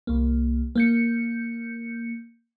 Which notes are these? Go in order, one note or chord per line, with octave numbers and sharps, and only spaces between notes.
C2 A#3
A#3 G6 C#7